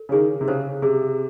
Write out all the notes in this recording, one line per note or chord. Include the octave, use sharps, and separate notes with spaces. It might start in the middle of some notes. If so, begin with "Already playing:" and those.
Already playing: A4
C#3
D#3 G#4
C3
C#3 C5
C3 G#4